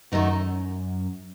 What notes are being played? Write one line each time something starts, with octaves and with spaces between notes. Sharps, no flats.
F#2 D#3 A3 D#4 F#4